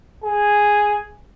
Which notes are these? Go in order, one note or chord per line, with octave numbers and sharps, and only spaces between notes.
G#4